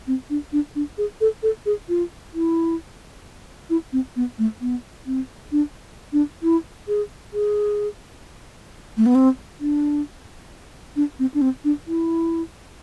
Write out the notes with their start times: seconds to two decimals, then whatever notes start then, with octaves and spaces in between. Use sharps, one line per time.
0.07 C4
0.30 D4
0.52 D4
0.75 D4
0.98 G#4
1.21 A4
1.43 A4
1.66 G#4
1.89 F4
2.34 E4
3.70 E4
3.93 C4
4.16 B3
4.38 A3
4.61 B3
5.06 C4
5.52 D4
6.13 D4
6.43 E4
6.88 G#4
7.33 G#4
8.97 A3
9.06 B3
9.15 C4
9.60 D4
10.96 D4
11.19 C4
11.34 D4
11.42 C4
11.64 D4
11.87 E4